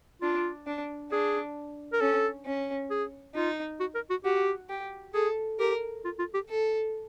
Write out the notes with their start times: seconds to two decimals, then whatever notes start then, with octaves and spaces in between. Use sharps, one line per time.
0.22 D4 F4
0.67 D4
1.11 D4 G#4
1.93 A#4
2.01 C#4 A4
2.46 C#4
2.90 G#4
3.35 D#4 F4
3.80 F#4
3.95 A#4
4.10 F#4
4.24 F#4 G4
4.69 G4
5.14 G#4 A4
5.59 G4 A#4
6.04 F4
6.19 F4
6.34 G4
6.49 A4